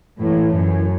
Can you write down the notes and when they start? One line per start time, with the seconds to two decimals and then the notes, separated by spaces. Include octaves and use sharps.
0.20 A2 E3
0.54 F#2 E3